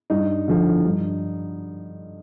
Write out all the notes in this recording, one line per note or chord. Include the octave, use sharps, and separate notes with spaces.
G2 D#4
D3 F3
G2